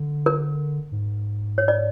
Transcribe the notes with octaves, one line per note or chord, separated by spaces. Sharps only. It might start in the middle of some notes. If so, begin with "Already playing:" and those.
Already playing: D3
A#4
G#2
C#5
D5